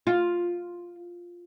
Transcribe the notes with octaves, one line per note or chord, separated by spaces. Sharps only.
F4